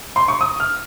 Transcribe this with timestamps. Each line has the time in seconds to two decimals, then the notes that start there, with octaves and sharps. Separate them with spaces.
0.16 C6
0.28 C#6
0.41 D#6
0.60 F6